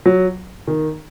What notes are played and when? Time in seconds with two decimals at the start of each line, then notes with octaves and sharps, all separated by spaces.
0.06 F#3
0.67 D#3